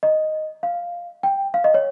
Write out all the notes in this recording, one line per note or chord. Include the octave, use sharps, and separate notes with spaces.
D#5
F5
G5
F5
D#5
C#5